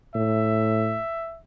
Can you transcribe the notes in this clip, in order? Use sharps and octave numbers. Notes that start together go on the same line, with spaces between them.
A2 E5